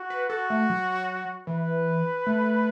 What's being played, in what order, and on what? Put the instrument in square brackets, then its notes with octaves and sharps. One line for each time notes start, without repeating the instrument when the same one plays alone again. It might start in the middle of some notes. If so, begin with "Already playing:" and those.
Already playing: [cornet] F#4
[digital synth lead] B4
[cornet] F#4 [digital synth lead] A4
[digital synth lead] A3
F#3
[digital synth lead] E3 [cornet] B4
[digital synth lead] A3